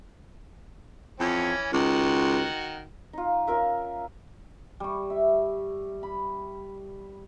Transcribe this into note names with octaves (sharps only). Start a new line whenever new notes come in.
F2 E3 C#4 C#5
C#2 D#3 F#4 F#5
D#4 F4
C#4 F4 A#4 E5
G3 C#6
E5
B5